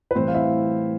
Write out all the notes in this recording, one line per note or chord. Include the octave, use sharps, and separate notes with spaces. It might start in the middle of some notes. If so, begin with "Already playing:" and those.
B4
A2 E3 G3 C4 C5
F5
E4 E5